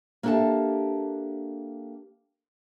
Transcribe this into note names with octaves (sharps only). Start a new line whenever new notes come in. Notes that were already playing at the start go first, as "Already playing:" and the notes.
A#3 D4 G4 A4 E5 A5